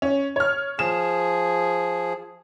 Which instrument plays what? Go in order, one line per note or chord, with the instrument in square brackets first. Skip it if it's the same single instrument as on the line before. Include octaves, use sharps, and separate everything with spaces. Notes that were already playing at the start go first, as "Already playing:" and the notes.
[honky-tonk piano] C#4
C#5 F6
[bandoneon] F3 G#4 [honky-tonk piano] E7